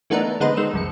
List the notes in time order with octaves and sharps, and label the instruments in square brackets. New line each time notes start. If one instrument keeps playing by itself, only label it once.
[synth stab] E3 A3 B3 D4 D#4 A#4
D3 G#3 B3 D#4 B4 C5
D#3 G#3 E6
C2 F2 C#7